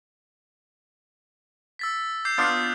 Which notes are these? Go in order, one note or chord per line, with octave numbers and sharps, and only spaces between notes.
E6 A6 B6
D6 G6 C7
B3 D4 F4 D#6 F6 G6